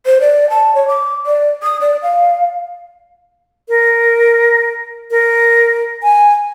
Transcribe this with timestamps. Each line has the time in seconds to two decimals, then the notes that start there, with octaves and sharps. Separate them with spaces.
0.06 C5
0.21 D5
0.50 A5
0.75 C#5
0.88 D6
1.26 D5
1.63 D#6
1.81 D5
2.02 F5
3.69 A#4
5.11 A#4
6.03 G#5